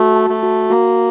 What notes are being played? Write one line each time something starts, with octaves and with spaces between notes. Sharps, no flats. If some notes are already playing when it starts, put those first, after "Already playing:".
Already playing: A3 F#4
A5
A3
F#4
A#3 F#4